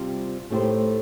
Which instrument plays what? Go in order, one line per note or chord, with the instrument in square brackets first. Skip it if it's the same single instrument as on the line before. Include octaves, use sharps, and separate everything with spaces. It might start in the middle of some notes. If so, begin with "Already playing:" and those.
Already playing: [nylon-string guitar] C3 G3 C4 F4
A2 A3 D#4 G4 C5